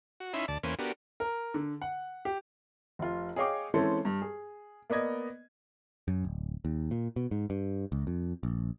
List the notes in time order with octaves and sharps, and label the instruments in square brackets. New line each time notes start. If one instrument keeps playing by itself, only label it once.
[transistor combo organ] F#4
C#4 D#4 E4 E5 B5 C6
D2 D5 A5
E2 A#3 C#4 B4 C5 G#5
B3 D4 F#4 G4 A#4
[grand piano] A#4
D3
F#5
G4
[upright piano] F1 F4
G#4 C#5 D#5 F5 G5 D6
E3 G#3 C4 C#4 E4 A4
G2
G#4
A#3 B3 D5 D#5 G#6
[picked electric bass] F#2
D1
D#2
A#2
B2
G#2
G2
C#2
F2
A#1